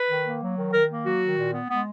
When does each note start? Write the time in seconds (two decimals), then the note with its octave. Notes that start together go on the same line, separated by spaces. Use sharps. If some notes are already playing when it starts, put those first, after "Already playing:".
Already playing: B4
0.08 D#3
0.25 A#3
0.41 F#3
0.57 D#3
0.73 D#3 A#4
0.89 A#3
1.04 F#3 F#4
1.21 D#3
1.37 A#2
1.53 B3
1.69 G#3 B3